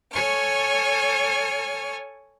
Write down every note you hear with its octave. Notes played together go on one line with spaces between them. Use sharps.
A4 C#5 G#5 C#6 F6